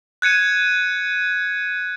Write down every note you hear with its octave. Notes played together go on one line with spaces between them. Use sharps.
F#6 G#6 C#7 D#7